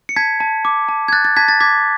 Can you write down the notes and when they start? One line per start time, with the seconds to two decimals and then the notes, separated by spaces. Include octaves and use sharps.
0.09 C#7
0.16 A5 G#6 B6
0.40 A5
0.65 D6
0.89 A5
1.08 G#6
1.13 F#6 A6
1.25 A6
1.36 A5 G#6 B6
1.48 A6
1.60 D6 G#6 B6